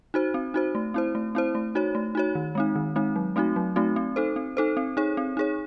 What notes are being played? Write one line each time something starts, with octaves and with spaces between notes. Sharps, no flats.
D#4 F#4 C5
C4
D#4 F#4 C5
A3
C4 E4 C5
A3
C4 E4 C5
A3
D#4 F#4 C#5
A3
D#4 F#4 C#5
D#3
G#3 C4 D#4
D#3
G#3 C4 D#4
F#3
A3 C4 D#4 F#4
F#3
A3 C4 D#4 F#4
C4
D#4 A4 C5
C4
D#4 A4 C5
C4
D#4 G#4 C#5
C4
D#4 G#4 C#5